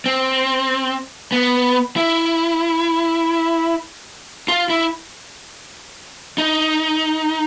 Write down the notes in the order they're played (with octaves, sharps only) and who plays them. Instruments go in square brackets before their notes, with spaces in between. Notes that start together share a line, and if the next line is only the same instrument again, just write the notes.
[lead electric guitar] C4
B3
E4
F4
E4
D#4